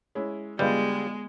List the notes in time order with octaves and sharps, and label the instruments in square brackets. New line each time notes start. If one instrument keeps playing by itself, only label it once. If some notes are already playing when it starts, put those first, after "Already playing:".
[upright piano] G#3 C#4 E4
[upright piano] D3 F4 B4 [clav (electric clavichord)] G3 [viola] G#3 [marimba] B3 G#4 D#5